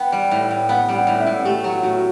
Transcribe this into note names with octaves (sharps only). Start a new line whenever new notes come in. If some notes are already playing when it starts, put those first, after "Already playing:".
Already playing: B3 G5
G3
A2
A2
B3 F#5
G3
F#5
A2
E5
A2
A3 G4
F#3
F#4
A2
F#4